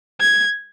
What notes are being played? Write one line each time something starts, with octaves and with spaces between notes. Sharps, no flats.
G#6